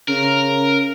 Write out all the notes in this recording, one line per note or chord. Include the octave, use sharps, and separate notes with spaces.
C#3 A#4